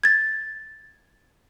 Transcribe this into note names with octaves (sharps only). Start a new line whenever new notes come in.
G#6 A6